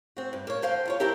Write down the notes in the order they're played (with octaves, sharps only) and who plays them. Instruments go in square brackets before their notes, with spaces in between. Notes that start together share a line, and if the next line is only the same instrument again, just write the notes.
[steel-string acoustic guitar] C4 F#4
G2
A#3 C#5
D3 C5 F5 G5
E2 F4 C#5
C4 D4 E4 G4 A#4